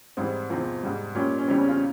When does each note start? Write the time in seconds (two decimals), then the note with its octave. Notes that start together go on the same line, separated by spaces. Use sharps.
0.17 G#2 E3 G3 C4
0.50 E2 C3 F3 C4
0.83 G#2 G3
1.15 A#2 G3 C#4
1.38 C#4
1.48 E2 C#3 E3 G3 C4
1.58 C#4
1.68 C#4 F4